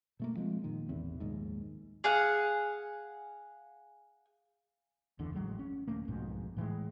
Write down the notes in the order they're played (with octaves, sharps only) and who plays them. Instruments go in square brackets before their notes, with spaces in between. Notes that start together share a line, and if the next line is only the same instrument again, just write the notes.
[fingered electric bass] B2 A3 A#3
F3 G#3 C4
F1 A#2 D#3
A1 E2 C3
A#1 D#2 G#2
[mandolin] G#4 F5 F#5
[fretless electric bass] F#1 E2 D3
A1 F#3 G#3
C#4
D#1 A3 A#3
B1 F2 G#2 B2
A2 E3 F3 G#3